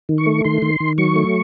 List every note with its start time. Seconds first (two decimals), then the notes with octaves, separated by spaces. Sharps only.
0.09 D#3
0.18 C#6
0.26 A3
0.44 D#3 C6
0.62 D#3
0.80 D#3
0.98 F#3 C#6
1.16 A3